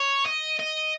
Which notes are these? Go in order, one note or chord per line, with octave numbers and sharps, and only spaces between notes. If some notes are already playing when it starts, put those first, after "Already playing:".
Already playing: C#5
D#5
D#5